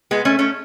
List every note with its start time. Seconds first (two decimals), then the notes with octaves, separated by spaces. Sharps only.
0.11 G#3 B3
0.25 A3 C#4
0.39 A3 C#4